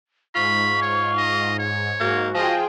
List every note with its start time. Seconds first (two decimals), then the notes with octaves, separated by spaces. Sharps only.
0.35 G#2 F4 B5 C#6
0.82 C#5
1.18 D#5
1.59 C#5
2.00 G#2 A#3 F#4
2.34 F3 F4 G#4 D#5 G5